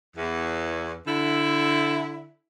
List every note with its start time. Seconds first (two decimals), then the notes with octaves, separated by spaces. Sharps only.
0.17 E2
1.07 D3 E4